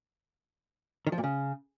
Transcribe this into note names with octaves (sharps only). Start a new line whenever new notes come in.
D#3
F3
A#2
C#3